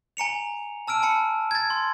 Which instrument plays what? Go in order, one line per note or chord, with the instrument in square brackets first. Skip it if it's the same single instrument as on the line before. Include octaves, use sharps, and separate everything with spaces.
[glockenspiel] G#5 A#5 C#7 F7
A5 E6 F6 D7
G#5 A5 B5 C#7
G#6 A6
C6